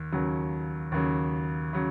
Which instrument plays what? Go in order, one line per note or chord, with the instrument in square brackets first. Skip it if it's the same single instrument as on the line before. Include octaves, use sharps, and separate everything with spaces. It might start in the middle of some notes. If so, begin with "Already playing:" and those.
Already playing: [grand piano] D#2
D#2 C#3 F#3
D#2 C#3 F#3
C#3 F#3